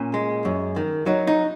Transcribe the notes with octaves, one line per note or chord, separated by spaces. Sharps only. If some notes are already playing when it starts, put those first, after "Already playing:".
Already playing: A#2 C#4
G#3
F#2
D#3
F#3 D#4
D#4